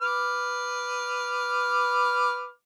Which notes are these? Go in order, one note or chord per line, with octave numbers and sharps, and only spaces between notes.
B4 D6 F6